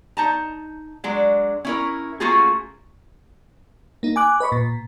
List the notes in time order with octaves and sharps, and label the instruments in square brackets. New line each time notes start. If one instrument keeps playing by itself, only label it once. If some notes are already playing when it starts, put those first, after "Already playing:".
[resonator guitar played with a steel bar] D#4 A5 A#5
F#3 G#3 D4
C#4 E4 A#4
A3 A#3 C#4 F4 F#4 G#4
[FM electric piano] A#3 D#4
G#5 D6 F#6
B4 D#5 B5 C#6
A#2